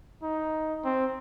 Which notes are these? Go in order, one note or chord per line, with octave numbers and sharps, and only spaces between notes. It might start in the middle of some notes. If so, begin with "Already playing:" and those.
D#4
C4